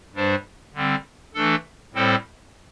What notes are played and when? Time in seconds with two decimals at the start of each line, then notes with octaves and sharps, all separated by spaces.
0.14 G2 G3 D4 C5
0.74 D3 G3 C4
1.34 E3 A3 D4 A4
1.94 A2 G3 C4 A4 C5